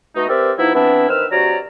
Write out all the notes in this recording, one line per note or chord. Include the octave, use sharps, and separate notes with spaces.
B2 A3 D#4
C4 G4 A#4 B4 D5 E5
F3 B3 D#4 E4
E3 B3 C4 D4 E4
D#3 C4 B4 E6 F6
C3 F#3 C#5 D5 A#5